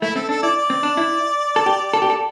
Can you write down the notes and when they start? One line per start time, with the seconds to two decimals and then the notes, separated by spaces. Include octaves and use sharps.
0.02 A3 E4
0.15 C4 A4
0.29 D4 A4
0.42 E4 D5
0.56 D5
0.70 C4
0.83 D4
0.97 E4
1.56 A4
1.66 G4
1.93 A4
2.02 G4
2.10 A4